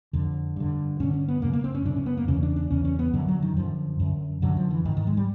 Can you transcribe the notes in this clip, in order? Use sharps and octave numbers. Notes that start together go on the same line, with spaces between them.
F2 D3
G2 D3
G2 D3 C#4
C#4
B3
F#2 C#3 A#3
A#3
C4
C#4
F#2 C#3 D4
C#4
B3
A#3
E2 C#3 C#4
D4
D4
E2 C#3 C#4
C#4
B3
F#2 D3 F#3
F#3
D#3
F#2 D3 F3
F#2 D3
F#2 D3 F#3
F3
E3
G#2 D#3
D#3
G#3
G3